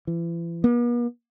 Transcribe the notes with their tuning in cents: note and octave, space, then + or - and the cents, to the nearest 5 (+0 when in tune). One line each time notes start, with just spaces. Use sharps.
E3 +40
B3 -45